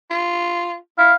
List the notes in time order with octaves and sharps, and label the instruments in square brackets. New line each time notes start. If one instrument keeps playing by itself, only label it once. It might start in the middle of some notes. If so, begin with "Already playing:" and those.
[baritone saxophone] F4
[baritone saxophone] E4 [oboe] F5